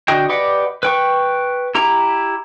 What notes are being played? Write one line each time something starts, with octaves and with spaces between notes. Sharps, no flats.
D3 F#4 D#5 G5
G4 B4 D5 D#5 F#5
B4 G5 C#6
E4 G4 A#5